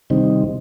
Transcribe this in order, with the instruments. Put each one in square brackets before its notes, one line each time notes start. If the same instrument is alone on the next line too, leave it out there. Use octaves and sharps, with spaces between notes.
[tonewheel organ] C3 D#3 G3 C4 D#4